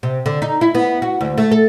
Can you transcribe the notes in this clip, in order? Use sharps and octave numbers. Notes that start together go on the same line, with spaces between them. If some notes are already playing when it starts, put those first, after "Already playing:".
C3
D3
D#4
E4
B3
F#4
D2
A3
A4